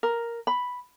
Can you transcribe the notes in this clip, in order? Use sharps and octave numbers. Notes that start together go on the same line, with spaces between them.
A#4
B5